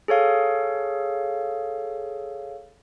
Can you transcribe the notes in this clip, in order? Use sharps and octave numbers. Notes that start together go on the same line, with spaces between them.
G#4 A4 C#5 F5